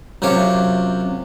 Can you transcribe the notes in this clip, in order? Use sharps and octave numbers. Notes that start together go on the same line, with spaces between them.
F#2 C3 F4 C#5 D6